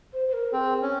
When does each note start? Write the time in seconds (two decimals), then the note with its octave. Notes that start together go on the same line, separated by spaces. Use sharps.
0.13 C5
0.28 C5
0.33 A#4
0.52 C4 G#4
0.82 C#4